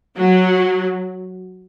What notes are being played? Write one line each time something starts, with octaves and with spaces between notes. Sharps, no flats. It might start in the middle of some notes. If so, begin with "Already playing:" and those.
F#3